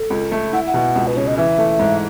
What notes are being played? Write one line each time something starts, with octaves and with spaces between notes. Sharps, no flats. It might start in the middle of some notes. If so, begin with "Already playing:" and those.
Already playing: A4
C#2
A3
E4 F#5
F#5
B2
C#2
B4
C#3 C#5
D#5
E3 E5
A3
G#2